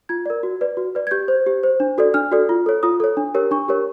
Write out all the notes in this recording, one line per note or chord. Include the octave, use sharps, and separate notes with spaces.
F4 G#6
A#4 D5
F#4
B4 D5
F#4
B4 D5
G#6
G4 G6
C5
G4
C5
D4
F#4 A4 D5
D4 F6
F#4 A4 D5
F4
A4 C#5
F4 D#6
A4 C#5
D4
G4 A#4 C#5
D4 C#6
G4 A#4 C#5